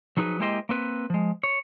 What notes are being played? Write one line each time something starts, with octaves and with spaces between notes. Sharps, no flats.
F3 F#3 D#4 G#4 B4
G#3 A#3 E4 G4 C5 D#5
A#3 C4 B4
F3 G#3
C#5